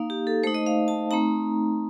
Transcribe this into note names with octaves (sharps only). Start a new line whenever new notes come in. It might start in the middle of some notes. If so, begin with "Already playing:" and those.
Already playing: A#3 D#4 F5
G4
A4
A3 D#4 C5
D#5
F5
A5
A3 C4 D#4 A#5